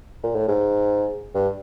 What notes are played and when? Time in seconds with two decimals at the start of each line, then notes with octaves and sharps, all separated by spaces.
0.24 A#2
0.36 A2
0.48 G#2
1.35 G2